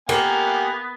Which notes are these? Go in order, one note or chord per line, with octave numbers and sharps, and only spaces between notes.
A#3 B3 G4 A#4 F#5 G#5